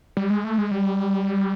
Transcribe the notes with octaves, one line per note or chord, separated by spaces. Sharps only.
G3
G#3
A3
G#3
G3